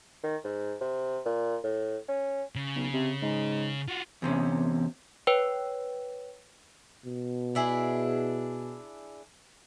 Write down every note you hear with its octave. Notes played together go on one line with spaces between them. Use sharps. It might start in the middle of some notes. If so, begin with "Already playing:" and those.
D#3
G#2
C3
A#2
A2
C#4
C#3
B1
C3
G#2
F4 F#4
E2 C3 C#4
B4 C#5 G5
B2
D4 E4 G#4